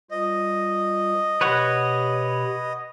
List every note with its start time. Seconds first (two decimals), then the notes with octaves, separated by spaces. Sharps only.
0.11 G3 F4 C5 D#5
1.41 B2 G4 B4 C#5 F#5 B5